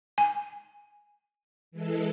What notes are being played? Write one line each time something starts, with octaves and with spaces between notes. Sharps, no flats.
G#5
E3 G#3 A4